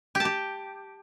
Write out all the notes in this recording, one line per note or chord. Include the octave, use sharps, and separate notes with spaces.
G4
A5
G4